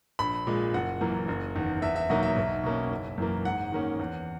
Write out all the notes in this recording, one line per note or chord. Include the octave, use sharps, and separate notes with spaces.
A#1 B5
A#2 G#3
F#1 F#5
F#2 E3 A#3
F#1
E2 D#3
E2 E5
E5
B2 F#3 A#3 D#4 D#5
E5
B1
B2 A#3 C#4
F#1
F#2 E3 A#3
G#2 F#5
D#3 A#3 C#4
E2